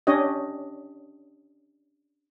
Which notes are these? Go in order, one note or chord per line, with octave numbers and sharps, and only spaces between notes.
C#4 D4 G4 C#5 D#5